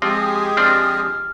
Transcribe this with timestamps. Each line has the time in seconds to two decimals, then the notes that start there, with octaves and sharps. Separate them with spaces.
0.02 F3 G#3 C4 G4 G#4
0.57 F3 C4 D4 F6